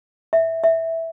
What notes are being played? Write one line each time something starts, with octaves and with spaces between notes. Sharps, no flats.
E5
E5